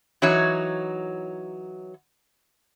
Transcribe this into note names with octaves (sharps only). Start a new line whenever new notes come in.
E3 F#3 D#4 F#4 C#5